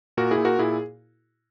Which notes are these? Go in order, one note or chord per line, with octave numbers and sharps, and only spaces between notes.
A#2 F#4 A#4
E4 G#4
A#2
F#4 A#4
A#2 E4 G#4